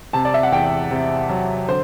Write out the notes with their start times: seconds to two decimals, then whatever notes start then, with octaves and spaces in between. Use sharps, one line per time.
0.13 C3 A5
0.25 D5
0.34 E5
0.43 F#5
0.52 E2 G5
0.91 C3
1.29 F#3
1.69 D3 C5